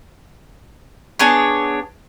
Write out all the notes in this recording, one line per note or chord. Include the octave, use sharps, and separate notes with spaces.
B3 D4 G#4 C#5